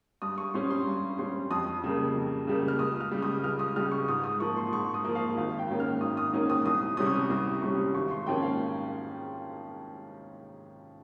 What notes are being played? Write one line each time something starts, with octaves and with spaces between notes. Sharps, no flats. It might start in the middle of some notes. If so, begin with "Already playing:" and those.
G2 D#6
C#6
G3 C#4 C6
C6
G2
G3 C#4 C6
F2 D#6
C#3 G3 A#3
F2
C#3 G3 A#3
F6
C#2 D#6
F6
C#3 G3
D#6
C#2 F6
D#6
C#3 G3 F6
C#6
G#2 D#6
D#6
F3 A#3 C#6
C6
G#2 C#6
D#6
F3 A#3
F5
G#1 F5
G5
G#2 D#3 A#3 C#4
F6
G#1 D#6
D#6
G#2 D#3 A#3 C#4
D#6
C2 D#6
C3 G3 C#4 D#6
C#6
D#6
C2 D#6
C3 G3 C#4 C#6
G#1 C#6
C6
G#2 F3 A#3 C#4 G5
F5